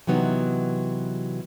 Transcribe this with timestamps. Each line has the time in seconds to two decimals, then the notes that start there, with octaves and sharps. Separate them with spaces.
0.07 C3 E3 F#3 B3 D#4